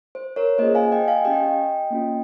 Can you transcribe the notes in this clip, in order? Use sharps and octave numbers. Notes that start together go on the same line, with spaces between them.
C5
A#4 C#5
A#3 C#4 F4 G#4 C5 D#5
F5 G#5
D#5 G5
F5 G#5
C#4 G4 D#5 G5
A#3 C#4 F4